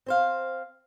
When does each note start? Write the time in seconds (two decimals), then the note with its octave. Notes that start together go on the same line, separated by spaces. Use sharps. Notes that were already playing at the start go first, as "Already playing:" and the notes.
0.06 C4 C5 F5